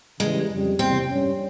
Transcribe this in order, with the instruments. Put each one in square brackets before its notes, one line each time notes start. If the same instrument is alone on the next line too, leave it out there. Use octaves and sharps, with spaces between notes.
[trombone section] C#3 E3 G3 [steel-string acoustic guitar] G#3
[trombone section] F2 C#3 G3
[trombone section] E2 C3 G3 [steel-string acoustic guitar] C4
[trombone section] G2 G3 C#4